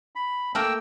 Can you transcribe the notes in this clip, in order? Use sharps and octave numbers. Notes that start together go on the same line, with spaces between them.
B5
A3 A#3 A#4 G5 E6